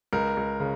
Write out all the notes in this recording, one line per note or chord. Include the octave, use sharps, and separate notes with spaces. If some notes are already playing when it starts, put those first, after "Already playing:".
C#2 A#4
C#2
C#3